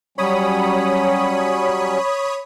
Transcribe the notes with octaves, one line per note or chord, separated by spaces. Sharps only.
F#3 G3 C#4 C#5 B5 D#6